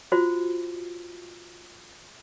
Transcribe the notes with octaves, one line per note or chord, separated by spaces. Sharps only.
F4 F#4 C5